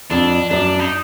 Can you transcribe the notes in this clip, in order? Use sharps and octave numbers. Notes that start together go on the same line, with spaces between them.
F2 D4
F#2 D4
D#4